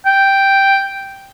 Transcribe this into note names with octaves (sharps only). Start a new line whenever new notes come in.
G5